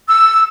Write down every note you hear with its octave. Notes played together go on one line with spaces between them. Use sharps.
E6